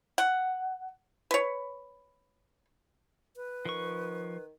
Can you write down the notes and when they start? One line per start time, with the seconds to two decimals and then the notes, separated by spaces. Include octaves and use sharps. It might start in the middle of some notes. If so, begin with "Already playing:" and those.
0.18 F#5
1.31 B4 C#5
3.36 B4
3.65 D#3 F3 C#6